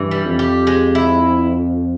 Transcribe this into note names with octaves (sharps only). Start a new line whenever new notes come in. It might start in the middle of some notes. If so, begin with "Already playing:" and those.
Already playing: G2 E3
G3
F2
G4
G#3
E4